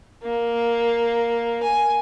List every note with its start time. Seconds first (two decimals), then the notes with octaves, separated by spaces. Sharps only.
0.22 A#3
1.63 G#5